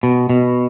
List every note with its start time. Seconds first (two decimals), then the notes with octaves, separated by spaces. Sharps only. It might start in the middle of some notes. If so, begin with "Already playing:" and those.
0.03 B2
0.30 B2